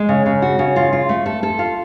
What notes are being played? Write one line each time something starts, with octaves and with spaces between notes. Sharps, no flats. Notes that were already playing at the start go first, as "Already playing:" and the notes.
Already playing: G#3
C#3
C#3
F#4
C#3
F4
F4
A3
A4
A4
F4